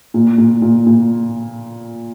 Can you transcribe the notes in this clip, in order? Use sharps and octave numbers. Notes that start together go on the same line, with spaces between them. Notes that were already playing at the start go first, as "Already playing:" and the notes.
A#2
A#2
A#2
A#2